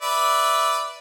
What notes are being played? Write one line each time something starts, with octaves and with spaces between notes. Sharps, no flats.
B4 D5 E5